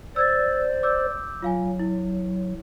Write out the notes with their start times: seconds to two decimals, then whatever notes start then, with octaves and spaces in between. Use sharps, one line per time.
0.16 C5 D5 E6 G#6 A6
0.83 D6 E6 G6
1.42 F#3 F4 F5 G#5
1.79 E4